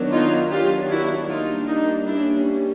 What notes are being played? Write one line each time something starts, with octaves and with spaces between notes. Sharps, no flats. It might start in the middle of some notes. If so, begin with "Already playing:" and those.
Already playing: D#3 F#3 B3 D4
D#4 F4
D#3 F#3 B3 D4 F4 G4
E4 F#4
G3 A#3 D4 D#4 F4
D#4
G3 A#3 C#4 D4 E4